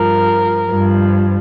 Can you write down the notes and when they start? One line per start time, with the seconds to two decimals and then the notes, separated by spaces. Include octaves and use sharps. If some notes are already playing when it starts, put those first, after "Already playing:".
Already playing: G2 F3 A#4
0.69 G2 F3